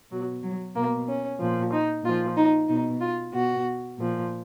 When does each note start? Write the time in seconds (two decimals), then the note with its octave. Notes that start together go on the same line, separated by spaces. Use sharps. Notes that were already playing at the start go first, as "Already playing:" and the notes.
0.11 B2 F#3
0.43 F#3
0.75 B2 A#3
1.08 C#4
1.40 A#2 F3
1.72 D#4
2.04 A#2 F3 F4
2.36 D#4
2.68 B2 D#4
3.01 F4
3.33 B2 F#4
3.98 A#2 F3